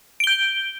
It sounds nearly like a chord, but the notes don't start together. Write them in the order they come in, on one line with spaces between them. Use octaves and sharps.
D7 G7 G6